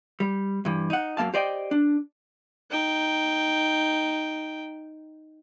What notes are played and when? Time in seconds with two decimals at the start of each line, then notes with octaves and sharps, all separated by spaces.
0.20 G3
0.65 G2 E3
0.90 D#4 F#5
1.17 F#2 A#3 F5 A5
1.34 G4 C5 D5 D#5 G5
1.71 D4
2.71 D#4 G5